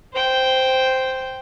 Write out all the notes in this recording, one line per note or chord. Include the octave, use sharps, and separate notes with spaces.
C5 G5